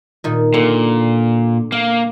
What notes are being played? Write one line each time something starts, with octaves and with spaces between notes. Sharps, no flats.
A#2 D#3
A#2 D3
A#3 F5